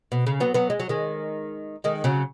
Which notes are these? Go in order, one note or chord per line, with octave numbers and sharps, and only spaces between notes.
B2
C#3
F#3 B3
F#3 B3
G#3
F#3
D#3 G#3
D#3 G#3
C#3 F#3